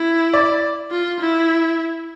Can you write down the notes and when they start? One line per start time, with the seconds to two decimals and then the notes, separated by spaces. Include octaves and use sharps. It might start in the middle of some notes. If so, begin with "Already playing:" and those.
Already playing: E4
0.34 D5
0.91 F4
1.20 E4